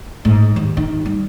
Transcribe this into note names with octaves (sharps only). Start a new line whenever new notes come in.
G#2
D#2
D#3
G3